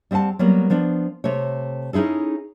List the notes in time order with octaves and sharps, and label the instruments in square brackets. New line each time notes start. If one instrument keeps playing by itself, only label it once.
[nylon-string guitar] G3 C4 E5 F#5 A5
F#3 G3 A#3 B3
F3 B3 D4
C3 A3 C#5
C#4 D#4 E4 G#4 A4